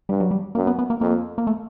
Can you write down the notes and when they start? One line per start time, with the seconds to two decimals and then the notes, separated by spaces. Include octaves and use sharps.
0.09 G2 G3
0.20 F#3
0.31 G3
0.55 F#2 A#3
0.67 B3
0.79 B3
0.90 A#3
1.01 F2 A#3
1.38 A#3
1.47 A3